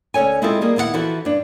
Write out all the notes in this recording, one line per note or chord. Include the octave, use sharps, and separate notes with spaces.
D2 C#4 A4 C#5 G#5
G#3 C4 E4 F4 G#4 A4
G3 A#3 G#4
D#2 B3 E4 F#4 F#5
E3 F3 E4 F#4 A4
G2 D4